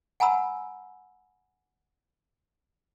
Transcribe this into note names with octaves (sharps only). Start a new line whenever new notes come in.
F#5 G#5 A#5 B5 E6